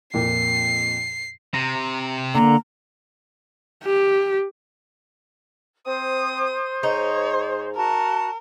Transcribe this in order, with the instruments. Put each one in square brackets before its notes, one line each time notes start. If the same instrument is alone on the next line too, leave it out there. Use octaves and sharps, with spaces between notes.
[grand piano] F2 A#2 [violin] C7
[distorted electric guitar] C3 [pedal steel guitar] A#5
[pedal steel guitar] D3 [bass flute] A#3 [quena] A#5
[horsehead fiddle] G4
[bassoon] C4 [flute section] C5 [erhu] D#6
[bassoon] G#2 [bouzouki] D#4 [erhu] C#5
[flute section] F#4 A5 [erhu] A#4